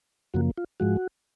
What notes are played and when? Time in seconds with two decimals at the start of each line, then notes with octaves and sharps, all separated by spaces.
0.34 F#2 C#3 F3 A#3 F#4
0.58 F4
0.80 G#2 F3 G#3 F#4